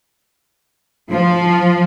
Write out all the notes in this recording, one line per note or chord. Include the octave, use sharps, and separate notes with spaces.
F3